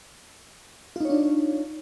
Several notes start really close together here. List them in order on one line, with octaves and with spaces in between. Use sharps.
F4 D#4 C#5 D4